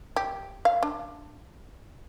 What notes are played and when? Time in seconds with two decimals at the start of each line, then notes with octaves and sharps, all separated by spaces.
0.16 G4
0.65 F5
0.83 D4